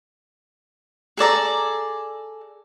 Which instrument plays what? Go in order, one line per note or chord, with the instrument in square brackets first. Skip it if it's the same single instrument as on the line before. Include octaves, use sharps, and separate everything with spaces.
[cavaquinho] G#4 A4 D5 A#5